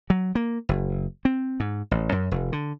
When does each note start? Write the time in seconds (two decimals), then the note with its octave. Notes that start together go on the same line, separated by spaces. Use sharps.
0.10 F#3
0.35 A#3
0.69 F#1
1.25 C4
1.60 G#2
1.91 A1
2.12 F#2
2.31 F1
2.52 D3